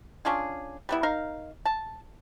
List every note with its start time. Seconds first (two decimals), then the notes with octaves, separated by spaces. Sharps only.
0.25 C#4 D4 F4 G#4
0.89 G3 B3 E4
1.03 D#4 A#4 F5
1.65 A5